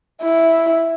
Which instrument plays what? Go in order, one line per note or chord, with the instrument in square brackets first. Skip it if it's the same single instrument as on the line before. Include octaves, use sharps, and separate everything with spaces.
[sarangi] E4